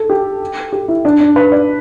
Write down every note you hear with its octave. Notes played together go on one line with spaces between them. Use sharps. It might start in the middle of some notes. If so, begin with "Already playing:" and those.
Already playing: A4
G4
G4
E4
D4
D4
B4
D5